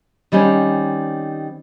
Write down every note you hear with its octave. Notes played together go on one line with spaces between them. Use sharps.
D#3 G3 C4 C#4